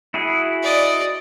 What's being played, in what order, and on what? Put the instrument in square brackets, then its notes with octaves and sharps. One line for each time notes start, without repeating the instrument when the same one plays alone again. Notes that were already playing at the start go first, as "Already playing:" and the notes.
[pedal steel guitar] E4 F#4 G#4
[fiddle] D5 D#5